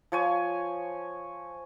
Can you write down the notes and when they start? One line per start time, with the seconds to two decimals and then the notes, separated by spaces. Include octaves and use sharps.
0.12 F3 C#5 G#5